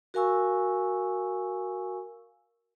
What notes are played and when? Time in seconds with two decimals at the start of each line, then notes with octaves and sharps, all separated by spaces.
0.14 F#4 A#4 F5 G#5 C#6 E6